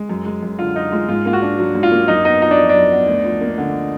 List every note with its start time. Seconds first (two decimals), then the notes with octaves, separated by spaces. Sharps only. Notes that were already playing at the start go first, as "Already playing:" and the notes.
Already playing: G#3
0.09 F#2
0.26 G#3
0.43 F#2
0.59 D3 F4
0.76 F#2 D#4
0.92 G#3 F4
1.08 G#2 F4
1.26 A#3 F4
1.33 F#4
1.42 D4
1.59 F#3
1.75 G#2
1.83 F4
1.92 A#3
2.08 F#2 D#4
2.25 B3 D#4
2.41 D#4 F4
2.51 D4
2.58 F3
2.69 D4
2.75 F#2
2.91 B3
3.07 D2
3.25 F3
3.41 A#3
3.58 D3